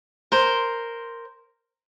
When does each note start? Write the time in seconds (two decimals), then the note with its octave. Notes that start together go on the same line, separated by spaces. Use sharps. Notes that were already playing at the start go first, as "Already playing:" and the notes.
0.32 A#4 C5